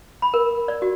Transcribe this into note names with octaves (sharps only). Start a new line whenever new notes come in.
B5
A#4
D5
F#4